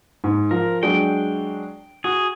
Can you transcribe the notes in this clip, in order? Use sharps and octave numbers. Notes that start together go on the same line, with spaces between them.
G#2
F3 A#4
F#3 G#3 D4 G5
F#4 G#4